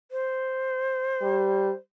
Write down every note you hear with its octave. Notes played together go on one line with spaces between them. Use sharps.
C5
G3